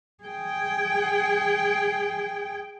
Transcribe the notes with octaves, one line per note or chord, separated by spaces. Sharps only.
G#4 G5